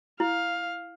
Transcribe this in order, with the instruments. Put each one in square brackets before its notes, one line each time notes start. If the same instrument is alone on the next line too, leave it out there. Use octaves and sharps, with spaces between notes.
[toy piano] E4 [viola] F5